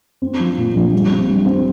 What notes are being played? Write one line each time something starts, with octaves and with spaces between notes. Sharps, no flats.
C4
F3
A#2
A#1
G3
C4
G3
C4